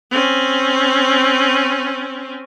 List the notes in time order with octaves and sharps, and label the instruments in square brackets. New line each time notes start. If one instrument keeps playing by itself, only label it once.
[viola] C4 C#4